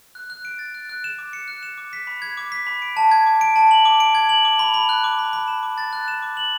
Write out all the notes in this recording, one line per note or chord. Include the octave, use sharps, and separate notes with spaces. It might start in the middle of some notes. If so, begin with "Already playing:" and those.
F#6
F#6
D7
A6
F#6
F#6
E7
D6
C#7
F#6
E7
D6
B6
B5
G#6
D6
B6
B5
D7
A5
G#6
D6
D7
A5
F#7
D6
D7
G#6
F#7
D6
B5
B5
F#6
D6
B5
B5
E7
D6
A6
F#6
E7
D6
F#7